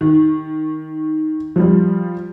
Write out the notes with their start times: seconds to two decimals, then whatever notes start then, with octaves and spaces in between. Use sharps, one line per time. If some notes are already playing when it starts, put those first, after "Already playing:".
0.01 D#3
1.56 F3 G3